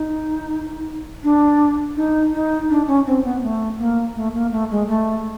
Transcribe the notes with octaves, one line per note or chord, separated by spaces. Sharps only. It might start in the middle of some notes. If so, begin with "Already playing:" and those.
Already playing: D#4
D4
D#4
D#4
D4
C#4
C4
B3
A3
A#3
A3
A#3
A3
G#3
A3